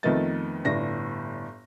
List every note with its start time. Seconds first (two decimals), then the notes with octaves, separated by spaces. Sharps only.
0.03 F2 D#3 A3 B3 D#5 A6
0.65 G1 A2 D4 A#6